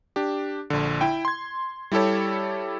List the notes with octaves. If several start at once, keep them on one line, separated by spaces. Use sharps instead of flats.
D4 G4
A#1 D3
E4 G5
C6 G#6
G3 E4 G4 A4 C#5